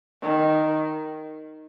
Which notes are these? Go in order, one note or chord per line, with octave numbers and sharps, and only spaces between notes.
D#3